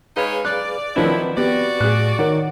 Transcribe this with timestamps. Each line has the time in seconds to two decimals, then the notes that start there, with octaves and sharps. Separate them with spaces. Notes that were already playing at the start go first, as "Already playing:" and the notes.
0.17 G#3 D#4 G#4 B4 C#5 F5
0.45 D5 F#6
0.96 D#3 F3 F#3 C4 D4 E4 B4
1.37 B3 F#4 G4 D5
1.81 A2 G#4 F#6
2.19 D#3 A#4 C#5 F#5